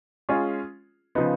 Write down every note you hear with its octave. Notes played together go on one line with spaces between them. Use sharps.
G#3 C#4 F4 G#4
C#3 F3 B3 D#4